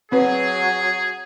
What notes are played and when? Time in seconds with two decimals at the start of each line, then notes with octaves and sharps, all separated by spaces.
0.12 F#3 C4 G#4 B4